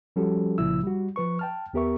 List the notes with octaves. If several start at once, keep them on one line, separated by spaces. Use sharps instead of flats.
F3 G3 C#4 F#4 G4 A4
C2 A#2 C#3 F3 E4 E6
G3 F#4
F3 B4 C#6
G5 A5 F6
D#2 B3 G4 A#4 E5 C#6